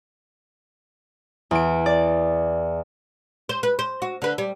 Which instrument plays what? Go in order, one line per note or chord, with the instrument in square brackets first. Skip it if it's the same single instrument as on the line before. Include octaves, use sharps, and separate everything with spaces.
[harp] E2 D7
D5
[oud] C5
B4
C5
F#4
D3 B4
G3